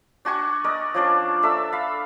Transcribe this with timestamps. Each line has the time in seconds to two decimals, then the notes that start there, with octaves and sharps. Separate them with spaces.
0.25 D4 F#4 G#5 C#6
0.64 A#4 D5 D#5
0.94 F3 C#4 D4 D5
1.43 D4 A4 E5
1.72 F5 B5